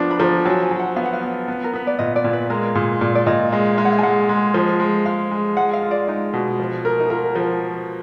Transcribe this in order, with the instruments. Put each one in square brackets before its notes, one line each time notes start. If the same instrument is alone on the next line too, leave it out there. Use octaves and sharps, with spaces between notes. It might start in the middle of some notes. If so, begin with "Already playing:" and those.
Already playing: [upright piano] F3 B3 D4
[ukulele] B5
[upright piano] F3 [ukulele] A#5
[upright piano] F#3 [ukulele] G#5
[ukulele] G#5
[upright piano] F#3
[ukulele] F#5
[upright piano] B3 [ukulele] F5
[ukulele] F#5
F5
[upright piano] B3
B3
[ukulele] A#4
[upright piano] B3 [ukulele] B4
[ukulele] D5
[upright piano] A#2 [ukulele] D#5
[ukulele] D5
[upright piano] A#2
[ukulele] B4
[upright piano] G#3 [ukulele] A#4
[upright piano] A#2 [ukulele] G#4
[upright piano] A#2 [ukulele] D5
[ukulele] D5
[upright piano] A#2 [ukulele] D#5
[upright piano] G#3 [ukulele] D#5
[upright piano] G#3 [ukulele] F5
[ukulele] F#5
F5
G#5
[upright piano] G#3 [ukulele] F#5
[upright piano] G#3
F3
G#3
[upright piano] G#3 [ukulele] F5
[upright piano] G#3
[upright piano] G#3 [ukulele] F#5
[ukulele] F5
[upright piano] F4
[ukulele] D5
[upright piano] G#3 [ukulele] D#4
[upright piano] B2
F3
A#4
[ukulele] D#4
[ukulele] F4 [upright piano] A#4
[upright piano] F3